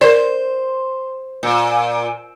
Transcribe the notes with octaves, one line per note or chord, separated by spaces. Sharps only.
A#4 C5 D5
A#2